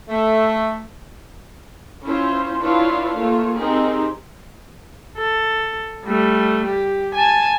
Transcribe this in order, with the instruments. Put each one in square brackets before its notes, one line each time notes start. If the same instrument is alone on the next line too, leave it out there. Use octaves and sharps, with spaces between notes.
[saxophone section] A3
[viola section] C#4 E4 F4 C5
D4 E4 F4 B4 C#5 F5
A3 A#3 F4 C#5
C4 D#4 G4 G#4 A#4
[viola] A4
G3 A3
G4
G#5 A5